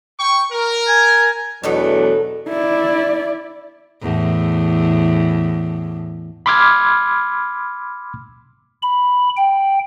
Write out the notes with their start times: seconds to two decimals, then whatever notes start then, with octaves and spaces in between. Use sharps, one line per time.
0.20 G5 C#6
0.52 A#4
0.88 G#5
1.64 E2 B2 F#3 A3 B3 D4 D#4 A4
2.49 E4 D5
4.02 E2 A2
6.46 B5 C6 D6 E6 F6 G#6
8.82 B5
9.37 G5